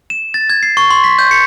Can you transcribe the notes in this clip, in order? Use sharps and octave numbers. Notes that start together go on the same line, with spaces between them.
E7
A6
G#6
C7
C#6
C6
B6
G6
C#7